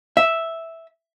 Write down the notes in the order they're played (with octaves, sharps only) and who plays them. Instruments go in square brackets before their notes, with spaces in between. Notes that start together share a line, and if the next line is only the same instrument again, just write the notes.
[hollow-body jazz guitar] E5